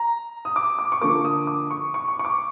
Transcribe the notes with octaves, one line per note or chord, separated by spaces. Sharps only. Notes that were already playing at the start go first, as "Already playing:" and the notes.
Already playing: A#5
D#6
D6
D6
C#6
D3 F3 A#3 D6
D#6
D6
C#6
C#6
C#6
C#6
D6